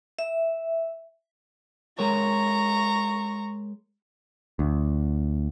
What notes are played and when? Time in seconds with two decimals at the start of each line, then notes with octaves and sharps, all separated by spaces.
0.19 E5
1.99 G#3 A#4 C#5 A#5 C#6
4.59 D2